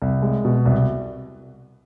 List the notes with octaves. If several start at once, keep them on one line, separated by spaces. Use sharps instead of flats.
C2
G#3
B2
C2